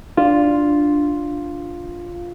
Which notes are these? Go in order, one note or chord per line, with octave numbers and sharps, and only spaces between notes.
D4 F4